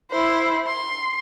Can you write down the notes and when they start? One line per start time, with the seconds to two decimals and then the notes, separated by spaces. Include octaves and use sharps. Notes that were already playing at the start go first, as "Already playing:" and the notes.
0.11 E4 C5
0.67 C6